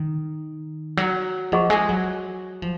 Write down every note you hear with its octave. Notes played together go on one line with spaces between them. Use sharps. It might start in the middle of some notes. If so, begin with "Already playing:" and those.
Already playing: D#3
F#3
F3 G#4 D#5 F#5 C#6
G#3
F#3
F3